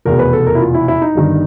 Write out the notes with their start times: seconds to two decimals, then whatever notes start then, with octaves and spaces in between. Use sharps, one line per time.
0.05 F1 E2 B2 A#4
0.19 B4
0.33 A4
0.47 A#4
0.55 E4
0.61 F4
0.74 E4
0.88 E4
1.02 D#4
1.15 G1 G2 D#3